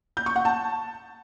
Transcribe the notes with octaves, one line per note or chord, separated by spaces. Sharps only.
G6
C#6
F#5
A5